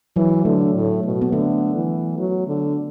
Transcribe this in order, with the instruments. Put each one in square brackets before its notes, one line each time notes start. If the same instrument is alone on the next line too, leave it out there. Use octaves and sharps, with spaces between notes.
[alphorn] E3 [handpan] F#3
[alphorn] D3 [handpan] A3
[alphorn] A2
B2
[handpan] B3
[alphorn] D3 [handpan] A3
[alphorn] E3
F#3
D3